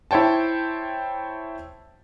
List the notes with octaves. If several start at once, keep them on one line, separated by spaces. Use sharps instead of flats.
E4 C5 C#5 G5 A5